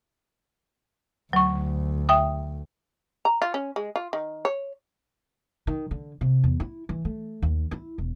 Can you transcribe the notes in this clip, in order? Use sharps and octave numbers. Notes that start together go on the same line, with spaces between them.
D2 F#3 C#6
E5 G5 D#6
A#5
F4
C#4
G#3
F4
D#3
C#5
D#3
D3
C3
E2
E4
E3
A3
D#2
E4
E1